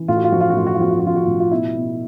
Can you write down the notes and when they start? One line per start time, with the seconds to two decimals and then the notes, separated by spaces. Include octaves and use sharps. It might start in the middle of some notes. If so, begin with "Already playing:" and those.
Already playing: E3
0.08 A2 F4
0.17 F#4
0.24 F4
0.32 F3 F#4
0.41 F4
0.50 F#4
0.56 A2 F4
0.67 F#4
0.74 F4
0.79 F3 F#4
0.90 F4
0.99 F#4
1.04 F3 F4
1.16 F#4
1.24 A2 F4
1.40 F4
1.51 B2 E4
1.75 B2